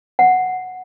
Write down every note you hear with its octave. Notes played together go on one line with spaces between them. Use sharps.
F#5